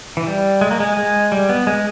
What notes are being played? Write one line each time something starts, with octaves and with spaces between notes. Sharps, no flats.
E3
G3
G#3
A#3
G#3
G#3
G3
B3
G#3